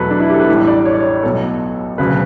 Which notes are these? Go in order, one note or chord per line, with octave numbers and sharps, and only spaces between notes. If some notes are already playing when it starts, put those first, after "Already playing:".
Already playing: E2 B2 F#3 A3 A4 B4
D4
E4
G4
A4
B4
A1 A2 E3 G3
D5
C#5
D5
C#5
B1 B2 F#3 A3 A4
E1 D2 C#3 F#3 B4